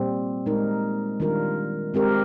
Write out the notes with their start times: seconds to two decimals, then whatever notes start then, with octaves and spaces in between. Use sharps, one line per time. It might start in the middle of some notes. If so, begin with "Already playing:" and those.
Already playing: A#2 G3 C4
0.46 A#2 G#3 D#4 A#4
1.20 D#3 G3 D4 F4 A#4
1.94 G#3 C4 G4 A#4